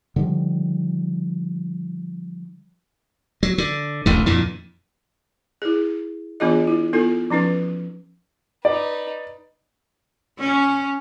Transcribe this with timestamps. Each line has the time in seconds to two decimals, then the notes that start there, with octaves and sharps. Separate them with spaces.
0.16 D3 D#3 F3 G3
3.43 F#3
3.58 D3
4.06 D1 A1 D2 D3
4.26 F2 A#2 D3 E3
5.62 E4 G#4
6.40 E3 B3 D4 F4 G#4 D#5
6.67 E4
6.93 B3 D#4 F4 A4
7.30 F3 C#4 D#4 B4
8.65 D#4 B4 D5
10.39 C#4